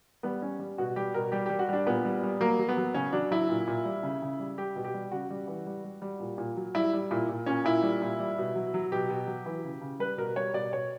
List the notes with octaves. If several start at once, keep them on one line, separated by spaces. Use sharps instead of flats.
G3 B3
G3 C#4
G3
B2 F#4
G3 G4
B2 A#4
G3 G4
G3 G4
F#4
G3 D4
A#2 B3
G3
G3
F#3 A#3
F#3
B3
F#3
C#3 C#4
F#3 D4
F#3 E4
A#2
A#2
G3
C#3
C#3
G3
G3 G4
B2
G4
G3
C#3 F#4
G3
E3
G3
G3
G3
A#2
A#2
F#3
G3 E4
G3
A#2 E4
A#2
A#2 C#4
A#2 E4
G3
A#2
G3
B2
F#3
F#3
B2 G4
B2
F#3
E3
C#3
C#3
G3 B4
B2 A#4
G3 C#5
B2 D5
B2 C#5